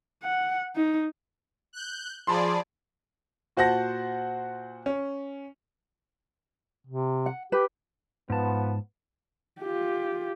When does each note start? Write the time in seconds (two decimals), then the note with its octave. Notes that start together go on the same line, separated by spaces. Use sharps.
0.23 F#5
0.76 D#4
1.73 F#6 G6
2.27 F3 G#4 D5 A5 B5 C6
3.57 A#2 F#4 C5 F#5 A5 A#6
4.86 C#4
6.87 C3
7.26 F#5
7.52 G4 B4
8.30 G#2 F3 B3 A5
9.60 F4 G4